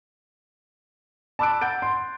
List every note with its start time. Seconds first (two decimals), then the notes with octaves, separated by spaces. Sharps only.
1.39 A5 B5 D6 E6 F#6 D7
1.61 F#5 G6 A6 D7
1.82 C6